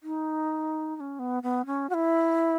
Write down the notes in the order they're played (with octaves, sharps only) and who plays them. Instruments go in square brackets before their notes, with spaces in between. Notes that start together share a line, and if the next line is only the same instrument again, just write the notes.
[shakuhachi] D#4
D#4
C#4
B3
B3
C#4
F#4
E4